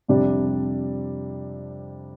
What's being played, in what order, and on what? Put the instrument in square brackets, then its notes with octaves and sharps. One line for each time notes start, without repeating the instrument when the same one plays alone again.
[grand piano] F2 C3 G3 D4